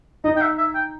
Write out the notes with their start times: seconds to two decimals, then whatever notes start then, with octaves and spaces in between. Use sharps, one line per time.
0.24 D#4 D#5
0.37 G5
0.41 E5
0.58 E5
0.75 G5